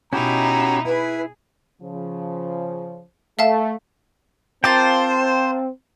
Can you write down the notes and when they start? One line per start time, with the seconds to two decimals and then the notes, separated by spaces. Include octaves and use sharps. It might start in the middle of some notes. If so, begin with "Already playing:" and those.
0.13 B2 C#4 D#4 E4 F#4 G4 A#5
0.85 E4 G#4 B4
1.82 C#3 F3
3.39 A3 E5 F5 A5
4.64 C4 F4 A#4 C5 G5 A5 D6